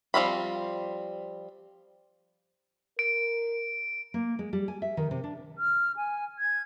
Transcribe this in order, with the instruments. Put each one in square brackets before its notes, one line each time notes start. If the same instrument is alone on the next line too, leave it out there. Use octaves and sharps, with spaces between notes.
[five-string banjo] F3 G3 C4 B5
[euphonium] A#4 [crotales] D7
[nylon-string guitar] A#3
G#3
G3
G#5
E5
D#3
C3
D4
[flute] F6
G#5
G#6